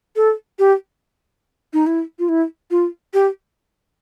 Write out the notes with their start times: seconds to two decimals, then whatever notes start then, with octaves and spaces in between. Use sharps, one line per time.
0.16 A4
0.59 G4
1.73 D#4
1.87 E4
2.19 F4
2.29 E4
2.71 F4
3.14 G4